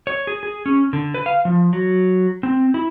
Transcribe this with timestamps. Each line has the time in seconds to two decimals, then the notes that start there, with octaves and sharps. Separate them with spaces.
0.07 C#5
0.27 G#4
0.43 G#4
0.66 C#4
0.93 D3
1.14 B4
1.26 F5
1.45 F3
1.73 F#3
2.43 C4
2.74 E4